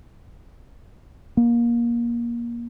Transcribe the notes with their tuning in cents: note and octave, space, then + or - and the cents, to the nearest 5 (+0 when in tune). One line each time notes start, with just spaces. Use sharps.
A#3 +20